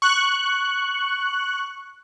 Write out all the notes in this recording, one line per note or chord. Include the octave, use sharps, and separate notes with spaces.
C#6 F#6